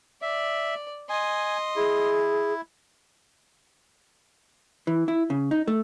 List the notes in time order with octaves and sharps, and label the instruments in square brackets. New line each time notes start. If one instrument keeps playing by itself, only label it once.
[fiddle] D5 [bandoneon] E5
[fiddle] D#5 C6 [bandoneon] G#5
[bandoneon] E4 [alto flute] G#4
[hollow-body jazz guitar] E3
E4
C#3
D#4
A3